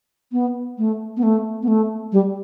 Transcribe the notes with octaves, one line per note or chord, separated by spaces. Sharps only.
B3
A3
B3
A3
B3
A3
G3